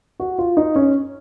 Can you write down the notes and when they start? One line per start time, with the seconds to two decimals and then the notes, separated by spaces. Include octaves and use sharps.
0.20 F#4
0.38 F4
0.57 D#4
0.76 C#4